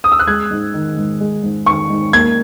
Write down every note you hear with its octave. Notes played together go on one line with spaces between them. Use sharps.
D#6
E6
F#6
G#3 G#6
G#2
D#3
G#2
G#3
G#2
D#3 C#6
G#2
A#3 G#6